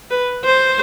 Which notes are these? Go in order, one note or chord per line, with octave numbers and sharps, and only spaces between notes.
B4
C5